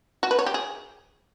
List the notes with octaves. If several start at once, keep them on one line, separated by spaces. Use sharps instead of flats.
F#4
B4
C#5
G4
G#4